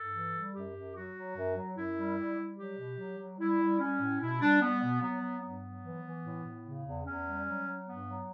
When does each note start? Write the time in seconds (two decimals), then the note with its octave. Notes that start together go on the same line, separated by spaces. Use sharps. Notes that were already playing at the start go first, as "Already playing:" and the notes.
Already playing: G2 A4
0.13 E3
0.33 G3
0.53 F#2 G4
0.74 F#2
0.95 F#3 F#4
1.14 F#3
1.36 F#2
1.55 F#3
1.76 F#2 E4
1.96 G3
2.17 G3
2.37 G3
2.57 F#3 G4
2.77 B2
2.97 F#3
3.18 F#3
3.38 G3 E4
3.59 G3
3.79 G3 C#4
4.00 A2
4.20 B2 E4
4.40 G3 D4
4.61 G3 B3
4.81 B2
5.01 F#3 B3
5.21 F#3
5.42 G2 B3
5.62 F#3
5.84 E3
6.03 E3
6.24 A2
6.43 A2
6.65 C#3
6.85 E2
7.05 E2 C#4
7.25 G3
7.46 F#3
7.66 F#3
7.86 G2 B3
8.07 F#3